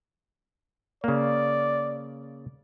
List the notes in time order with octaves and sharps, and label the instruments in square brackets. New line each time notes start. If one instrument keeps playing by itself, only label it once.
[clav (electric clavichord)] C#3 A#3 [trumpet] D5